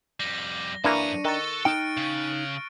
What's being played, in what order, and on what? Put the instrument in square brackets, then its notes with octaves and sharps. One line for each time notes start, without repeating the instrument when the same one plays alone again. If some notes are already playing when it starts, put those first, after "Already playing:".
[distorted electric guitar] F2 G3 [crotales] A#6
[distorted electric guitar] F#2 A#5 [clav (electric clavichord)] E3 A#3 [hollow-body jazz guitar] D4 [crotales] C#6 C#7 D#7
[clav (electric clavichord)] D#3 [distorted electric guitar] A4 [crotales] F#6 A6
[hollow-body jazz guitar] D#4 G5 [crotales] F6 D7
[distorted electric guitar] C#3